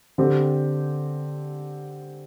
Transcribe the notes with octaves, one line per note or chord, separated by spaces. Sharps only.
D3 C4 G4